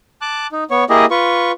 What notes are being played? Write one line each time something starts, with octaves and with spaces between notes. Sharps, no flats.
A5 D6 F#6
D#4
B3 C#5
A#3 E4 G4 G#4 D#5
F4 B4 C#6